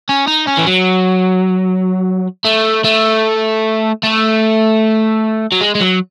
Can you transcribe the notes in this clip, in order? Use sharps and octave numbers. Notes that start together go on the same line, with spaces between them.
C#4
D#4
C#4
E3
F#3
A3
A3
A3
F#3
G#3
G#3
F#3